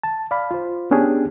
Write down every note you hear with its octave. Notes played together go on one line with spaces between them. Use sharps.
A5
D5 F5 B5
F4 C5
B3 C#4 D4 G4 G#4